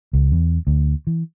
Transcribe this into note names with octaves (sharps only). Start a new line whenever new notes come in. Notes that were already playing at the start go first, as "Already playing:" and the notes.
C#2
E2
D2
E3